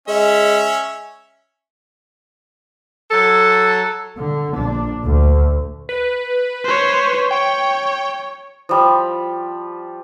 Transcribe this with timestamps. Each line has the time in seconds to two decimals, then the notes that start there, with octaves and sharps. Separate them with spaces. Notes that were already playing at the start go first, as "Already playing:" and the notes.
0.08 G#3 C#4 E5
3.11 F#3 A4
4.18 D3
4.55 A#1 D4
5.04 D2
5.89 B4
6.64 C5 C#5
7.31 C#5 G5
8.69 F3 G3